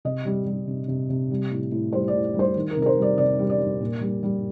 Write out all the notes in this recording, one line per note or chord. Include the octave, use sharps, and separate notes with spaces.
C3 D#5
G3
G3
C3
C3
C3
G3
A2
A2
G3 C5
D5
A2
G3
C5
D#3
A#4
C3
A#4
C5
G3 D5
C3 D5
G3
D5
G3
A#2
G3
G3